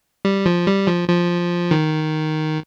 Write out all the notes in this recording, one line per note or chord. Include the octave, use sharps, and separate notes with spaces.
G3
F3
G3
F3
F3
D#3